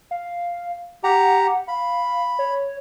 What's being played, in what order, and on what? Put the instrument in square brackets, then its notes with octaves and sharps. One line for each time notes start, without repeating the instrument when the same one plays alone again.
[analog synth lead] F5
[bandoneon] G4 A#5 [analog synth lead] F#5
[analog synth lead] F5 [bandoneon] B5
[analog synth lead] C#5